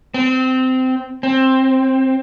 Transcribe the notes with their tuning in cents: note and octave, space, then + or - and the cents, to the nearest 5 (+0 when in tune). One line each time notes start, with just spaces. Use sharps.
C4 -20
C4 +10